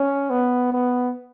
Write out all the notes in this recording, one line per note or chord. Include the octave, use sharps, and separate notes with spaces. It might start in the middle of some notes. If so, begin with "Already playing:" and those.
Already playing: C#4
B3
B3